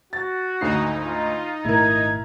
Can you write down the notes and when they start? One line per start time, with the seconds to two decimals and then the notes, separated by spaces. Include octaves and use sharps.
0.13 F#4 A6
0.61 G#1 D2 D#4 C7
1.04 F4
1.64 G#1 A#2 A3 E4 A#4 G#6